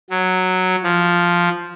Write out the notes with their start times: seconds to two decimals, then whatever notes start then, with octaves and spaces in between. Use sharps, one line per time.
0.10 F#3
0.83 F3